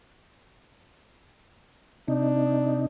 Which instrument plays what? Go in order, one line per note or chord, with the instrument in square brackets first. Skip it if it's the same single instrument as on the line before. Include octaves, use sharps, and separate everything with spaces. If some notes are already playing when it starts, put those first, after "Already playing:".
[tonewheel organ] C3 D#4 [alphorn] D4